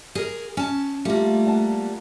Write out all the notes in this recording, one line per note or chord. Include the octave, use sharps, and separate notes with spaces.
G#4 A#4
C#4 A5
G3 A3 A#3 F4
A#4 F#5 A5